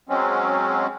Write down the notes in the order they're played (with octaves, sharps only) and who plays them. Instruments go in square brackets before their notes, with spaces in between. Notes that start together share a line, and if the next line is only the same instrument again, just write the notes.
[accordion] F#3 G#3 C4 C#4